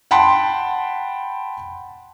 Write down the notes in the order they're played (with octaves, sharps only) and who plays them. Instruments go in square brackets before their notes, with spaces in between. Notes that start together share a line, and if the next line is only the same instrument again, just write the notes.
[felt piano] F#5 G5 A5 B5 C6